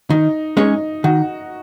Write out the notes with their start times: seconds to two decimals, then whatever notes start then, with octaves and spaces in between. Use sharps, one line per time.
0.10 D#3 D#4
0.57 G#3 C#4 D#4 G#4 C#5
1.04 D#3 F#4